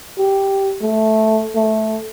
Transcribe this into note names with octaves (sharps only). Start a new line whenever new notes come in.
G4
A3
A3